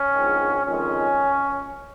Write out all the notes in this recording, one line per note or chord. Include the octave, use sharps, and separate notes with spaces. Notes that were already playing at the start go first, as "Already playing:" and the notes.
Already playing: C#4
A#1 G#2 D#3
F2 D#3 G#3 C#4